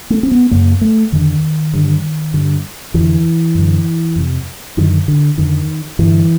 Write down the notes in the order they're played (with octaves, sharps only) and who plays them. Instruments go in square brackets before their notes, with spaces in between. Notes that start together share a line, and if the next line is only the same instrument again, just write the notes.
[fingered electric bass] A3
C4
B3
F#2 C#3 A#3
A3
F2 D3 D#3
G2 D3
G2 D3
F2 D3 E3
F#2 D3
F2 C3
F#2 D3 D#3
D3
F2 D3 D#3
G2 D3 E3